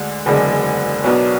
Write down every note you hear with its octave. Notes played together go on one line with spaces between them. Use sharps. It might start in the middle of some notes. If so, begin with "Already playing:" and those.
Already playing: D2 D3 G#3
F#1 E2 D3 G#3 D4
B1 B2 F#3 B3 D4